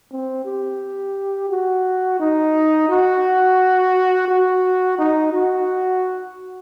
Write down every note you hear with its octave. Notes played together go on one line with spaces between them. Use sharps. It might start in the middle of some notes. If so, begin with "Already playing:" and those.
C4
G4
F#4
D#4
F#4
F#4
D#4
F#4